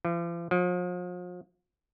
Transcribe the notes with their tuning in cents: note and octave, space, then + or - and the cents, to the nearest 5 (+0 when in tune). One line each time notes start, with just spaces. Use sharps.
F3 -45
F3 +40